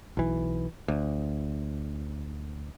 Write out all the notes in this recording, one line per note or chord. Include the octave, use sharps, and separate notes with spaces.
B1 E3
D2